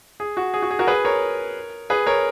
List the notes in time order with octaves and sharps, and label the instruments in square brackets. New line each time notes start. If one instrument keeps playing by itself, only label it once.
[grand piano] G#4
F#4
G#4
F#4
G#4
F#4 A#4
G#4 B4
A#4 C#5
G#4 B4
A#4 C#5